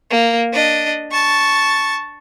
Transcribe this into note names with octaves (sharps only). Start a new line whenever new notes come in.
A#3
D4 D#5
A5 C#6